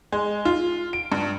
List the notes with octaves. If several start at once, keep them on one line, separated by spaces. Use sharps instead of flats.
G#3
F4
D7
G2